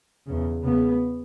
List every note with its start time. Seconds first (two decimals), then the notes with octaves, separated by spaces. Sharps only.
0.27 E2 C#3
0.63 E2 C#3 B3